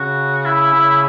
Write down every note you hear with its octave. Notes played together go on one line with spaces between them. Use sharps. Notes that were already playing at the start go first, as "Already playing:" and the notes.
Already playing: C#3 F#4
E4
C#3